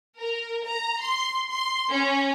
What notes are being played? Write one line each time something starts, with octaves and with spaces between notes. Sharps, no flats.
A#4
A#5
C6
C6
C#4